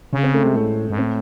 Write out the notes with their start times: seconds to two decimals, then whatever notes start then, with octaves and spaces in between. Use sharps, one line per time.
0.13 C#3 C#4
0.23 C4
0.34 A3
0.43 C3 G#3
0.55 A2 A3
0.90 G#2
0.98 A2 C4